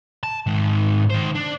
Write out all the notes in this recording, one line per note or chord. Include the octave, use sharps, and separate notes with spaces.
A5
G#2 D#3
D#3 C5
D4